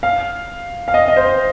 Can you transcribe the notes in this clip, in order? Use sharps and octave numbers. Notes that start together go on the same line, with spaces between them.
F5
F5
D#5
D#5
C5